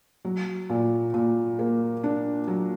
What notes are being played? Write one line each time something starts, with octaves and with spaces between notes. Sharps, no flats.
F#3
A#2
A#2
A#3
D4
F#3